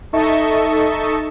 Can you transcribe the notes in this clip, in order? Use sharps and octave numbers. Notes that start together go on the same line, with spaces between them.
D#4 A4 D#5 E5 A5 C#6